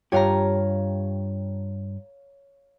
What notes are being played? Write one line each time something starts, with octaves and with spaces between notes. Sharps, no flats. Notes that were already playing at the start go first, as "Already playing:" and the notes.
G2 F4 G4 C#5 F5 A#5